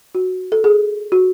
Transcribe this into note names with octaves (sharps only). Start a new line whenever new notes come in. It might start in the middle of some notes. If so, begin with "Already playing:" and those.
F#4
A4
G#4
F#4